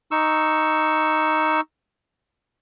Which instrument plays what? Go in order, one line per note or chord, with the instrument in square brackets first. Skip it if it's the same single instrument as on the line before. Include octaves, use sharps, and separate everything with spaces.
[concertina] D#4 C#6 E6